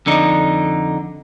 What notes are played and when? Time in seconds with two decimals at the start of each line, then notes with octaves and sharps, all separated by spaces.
0.06 F2 D3 D#4